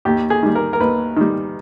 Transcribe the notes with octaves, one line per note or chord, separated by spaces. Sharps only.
D#2 G4
G#4
D#3 G3
A#4
A#4
D#2 B4
D#3 G3